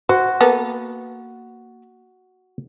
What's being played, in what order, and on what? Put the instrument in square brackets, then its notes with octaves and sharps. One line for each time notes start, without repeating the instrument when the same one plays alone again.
[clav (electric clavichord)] F#4 [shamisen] C5
[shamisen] A#3 B3 A4